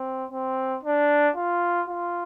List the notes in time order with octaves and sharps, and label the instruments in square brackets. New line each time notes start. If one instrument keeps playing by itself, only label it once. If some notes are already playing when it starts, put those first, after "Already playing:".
Already playing: [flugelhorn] C4
C4
D4
F4
F4